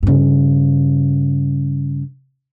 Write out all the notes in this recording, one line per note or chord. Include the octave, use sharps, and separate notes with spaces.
G2 C#3